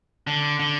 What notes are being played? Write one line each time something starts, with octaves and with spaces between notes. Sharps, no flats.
D3
D3